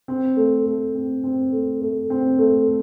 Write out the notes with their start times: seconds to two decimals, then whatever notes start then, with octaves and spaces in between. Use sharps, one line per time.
0.08 C4
0.37 A3
0.66 A3
0.94 C4
1.23 C4
1.52 A3
1.81 A3
2.10 C4
2.38 A3